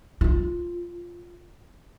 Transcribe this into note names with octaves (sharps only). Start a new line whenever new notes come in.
D#4 F4